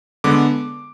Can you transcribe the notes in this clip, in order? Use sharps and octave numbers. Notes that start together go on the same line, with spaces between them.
D3 G#3 B3 D6